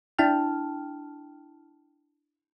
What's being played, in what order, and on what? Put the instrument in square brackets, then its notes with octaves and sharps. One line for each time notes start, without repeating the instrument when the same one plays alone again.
[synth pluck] D4 E4 G5 A5 F6